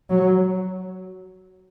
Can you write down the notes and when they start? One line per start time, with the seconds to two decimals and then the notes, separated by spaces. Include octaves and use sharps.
0.10 F#3